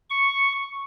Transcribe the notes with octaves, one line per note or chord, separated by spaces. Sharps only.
C#6